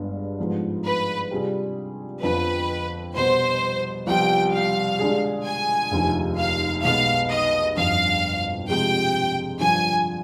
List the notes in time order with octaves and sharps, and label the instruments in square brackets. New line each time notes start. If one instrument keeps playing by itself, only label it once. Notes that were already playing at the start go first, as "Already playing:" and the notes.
Already playing: [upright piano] G1 G2 G#3 B3
G#2 F3 B3
[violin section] B4
[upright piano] C3 G3 D4 F4 G#4
[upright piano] F2 D3 F3 B3 [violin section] B4
[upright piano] C2 B2 B3 [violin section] C5
[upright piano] C2 C3 F3 B3 F4 [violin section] G5
[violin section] F5
[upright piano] D3 G#3 D4 G#4
[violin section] G#5
[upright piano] F1 D#2 D3 F3
[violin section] F5
[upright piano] B1 B2 G#3 B3 [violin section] F5
[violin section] D#5
[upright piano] G1 F2 D3 [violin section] F5
[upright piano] C3 F3 G#3 C4 [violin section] G5
[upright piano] G2 D3 F3 [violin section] G#5